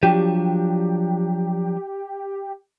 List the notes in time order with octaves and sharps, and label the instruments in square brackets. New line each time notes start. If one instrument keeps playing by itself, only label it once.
[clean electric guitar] F3 F#3 D4 [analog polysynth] G4